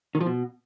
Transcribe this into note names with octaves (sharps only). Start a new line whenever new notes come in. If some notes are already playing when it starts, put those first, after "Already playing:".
D#3
F3
B2